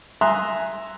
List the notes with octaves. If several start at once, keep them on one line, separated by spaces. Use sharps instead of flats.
E5 G#5 A#5 C6 D#6 F#6